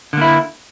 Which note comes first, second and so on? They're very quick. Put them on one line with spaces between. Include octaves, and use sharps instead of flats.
D3 A#3 E4